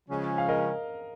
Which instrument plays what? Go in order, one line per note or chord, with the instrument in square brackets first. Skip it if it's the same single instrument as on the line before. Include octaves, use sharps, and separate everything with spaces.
[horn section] C#3 F3 G#3 C#4
[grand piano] F5
A#4 D#5